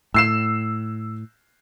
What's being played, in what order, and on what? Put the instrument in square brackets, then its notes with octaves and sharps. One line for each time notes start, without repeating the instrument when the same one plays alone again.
[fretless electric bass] A2 [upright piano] E6 C7 E7